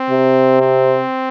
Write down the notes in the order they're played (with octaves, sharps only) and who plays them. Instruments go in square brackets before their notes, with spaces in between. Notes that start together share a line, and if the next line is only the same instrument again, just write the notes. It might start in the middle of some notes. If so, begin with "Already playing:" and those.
Already playing: [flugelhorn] C4
[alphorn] C3
[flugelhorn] C4